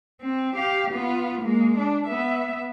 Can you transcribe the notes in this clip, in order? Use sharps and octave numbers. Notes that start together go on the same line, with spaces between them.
C4
G4 F5
B3 F4
G#3 A#3
D4
B3 E5